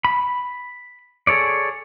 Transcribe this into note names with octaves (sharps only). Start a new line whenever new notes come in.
B5
G#4 A4 C#5 D5